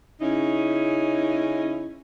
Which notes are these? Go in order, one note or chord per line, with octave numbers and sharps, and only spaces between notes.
C#3 C#4 D#4 E4